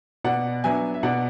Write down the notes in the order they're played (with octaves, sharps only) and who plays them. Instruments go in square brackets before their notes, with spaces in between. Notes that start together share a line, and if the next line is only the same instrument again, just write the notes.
[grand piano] B2 D5 F#5
F#3 B3 D4 E5 G#5
E5
B2 D5 F#5